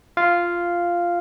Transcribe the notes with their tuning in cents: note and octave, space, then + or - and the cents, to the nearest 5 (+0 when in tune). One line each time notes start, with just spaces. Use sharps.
F4 -5 F5 -5